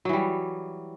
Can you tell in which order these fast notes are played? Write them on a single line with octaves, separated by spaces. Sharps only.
F#3 E3 G3